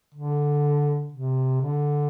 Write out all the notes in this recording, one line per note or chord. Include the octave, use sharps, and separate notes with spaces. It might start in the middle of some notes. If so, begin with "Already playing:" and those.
D3
C3
D3